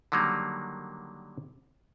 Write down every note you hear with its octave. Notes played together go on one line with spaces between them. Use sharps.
D3 D#3 F#3 G3 A#3